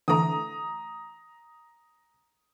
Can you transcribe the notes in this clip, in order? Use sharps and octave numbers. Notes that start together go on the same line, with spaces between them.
D3 E3 A3 A#5 D#6